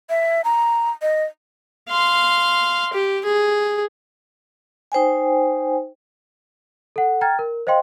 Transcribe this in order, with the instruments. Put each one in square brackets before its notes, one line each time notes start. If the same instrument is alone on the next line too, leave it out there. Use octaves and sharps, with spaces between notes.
[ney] E5
A#5
D#5
[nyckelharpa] F5 C6
G4
G#4
[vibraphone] D#4 C5 G5 G#5
[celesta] A4 F#5
G5 A#5 F6 G#6 A6
A#4
C5 D#5 F5 G5 C6